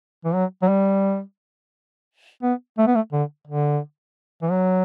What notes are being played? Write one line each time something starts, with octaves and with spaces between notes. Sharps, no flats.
E3
F#3
F#3
G3
B3
A3
B3
A3
D3
D3
E3
F#3